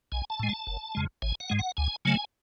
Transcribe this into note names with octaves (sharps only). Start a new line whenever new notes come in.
B1 G#5
A5
A2 G#3 G#5
A5
F#1
F2 C#3 G#3
A1 G#5
F#5
G#2 G#3
F#5
D2 G#5
C#3 F#3 A3 G#5